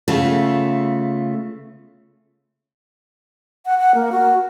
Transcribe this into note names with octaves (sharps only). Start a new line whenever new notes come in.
C#3 A3 B3 F4 A4
F#5
F#5
A#3
F#4